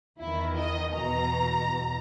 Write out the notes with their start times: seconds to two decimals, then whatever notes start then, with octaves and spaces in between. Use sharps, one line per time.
0.20 E2 D#3 E4
0.58 D#5
0.94 E2 B2 A#5
1.69 E2